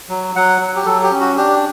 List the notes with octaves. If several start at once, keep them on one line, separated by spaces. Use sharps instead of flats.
F#3
F#3 F#5
F#3
G4
F#3 A4
G4
C#4
F#4
D4 G4